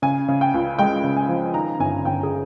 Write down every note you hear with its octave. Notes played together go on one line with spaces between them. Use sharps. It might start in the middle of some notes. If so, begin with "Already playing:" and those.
C#3 G#5
C#3
G5
C#2
G#3 G5
C#3
G#5
F3
D#3 A#5
G1 G#5
G1 G5
G#4